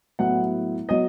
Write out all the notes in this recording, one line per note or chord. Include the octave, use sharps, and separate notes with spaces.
A2 F#3 B3 E4 F#5
F#3 B3 D#5